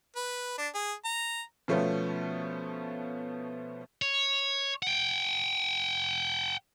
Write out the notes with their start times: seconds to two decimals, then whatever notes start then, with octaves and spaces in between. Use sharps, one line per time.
0.16 B4
0.58 D4
0.75 G#4
1.05 A#5
1.68 B2 F3 A3 B3 C#4
4.02 C#5
4.83 F#5 G5